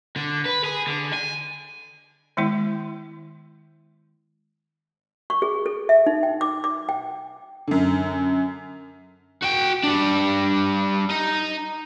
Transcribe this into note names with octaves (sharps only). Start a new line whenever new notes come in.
D3
B4
G#4
D3
G#5
D#3 G#3 B3 E4
C#6
G#4
A4
E5
D#4
G5
D6
D6
G5
F#2 D3
F#4 G5
G3 D4
D#4